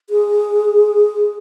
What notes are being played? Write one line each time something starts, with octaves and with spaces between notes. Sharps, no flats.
G#4